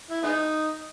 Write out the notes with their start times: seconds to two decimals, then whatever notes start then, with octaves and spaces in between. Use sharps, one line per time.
0.11 E4
0.23 G#3 B3 D#4